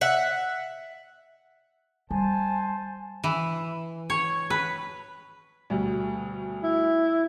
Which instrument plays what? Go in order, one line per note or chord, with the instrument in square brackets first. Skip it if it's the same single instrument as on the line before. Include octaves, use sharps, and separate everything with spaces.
[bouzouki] E5 F#5
[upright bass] G3 [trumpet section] C5 A5 [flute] G#5
[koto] E3
C#5
B4
[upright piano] D2 B2 G3
[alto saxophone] E4